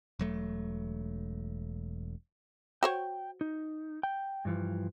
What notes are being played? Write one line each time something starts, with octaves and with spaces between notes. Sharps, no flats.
E1 F#3 A3
F#4 C5 C#5 G5
D#4
G5
G2 E3 F3